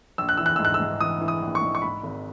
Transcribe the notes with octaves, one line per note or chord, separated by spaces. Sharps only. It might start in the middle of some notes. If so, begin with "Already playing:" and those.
A#1 E6
F#6
E3 E6
F#6
G#2 E6
F#6
E6
G#2
E3 D#6
E3
D#6
A#1
C#6
G#2
C#6
G#2 B5
G#1